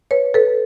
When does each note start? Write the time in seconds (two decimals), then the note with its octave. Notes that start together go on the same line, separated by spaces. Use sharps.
0.11 B4 C#5
0.34 A4 B4